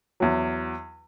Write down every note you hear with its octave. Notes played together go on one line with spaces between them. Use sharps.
E2 F#3